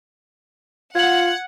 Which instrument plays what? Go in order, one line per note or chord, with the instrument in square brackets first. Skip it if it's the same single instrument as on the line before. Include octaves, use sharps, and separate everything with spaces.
[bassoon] F4 [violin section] F#5 [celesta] G#6 F#7